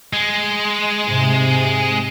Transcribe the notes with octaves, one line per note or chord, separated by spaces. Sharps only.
G#3
G#2 C3